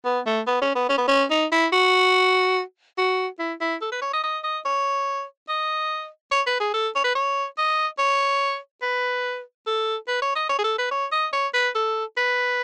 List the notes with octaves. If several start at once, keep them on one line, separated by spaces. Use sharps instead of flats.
B3
A3
B3
C#4
B3
C#4
B3
C#4
D#4
E4
F#4
F#4
E4
E4
A4
B4
C#5
D#5
D#5
D#5
C#5
D#5
C#5
B4
G#4
A4
C#5
B4
C#5
D#5
C#5
B4
A4
B4
C#5
D#5
C#5
G#4
A4
B4
C#5
D#5
C#5
B4
A4
B4